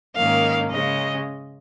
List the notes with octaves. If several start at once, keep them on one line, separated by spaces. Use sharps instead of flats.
G#2 D#3 A#3 C#4 F5
C#3 G#3 C#4 D#5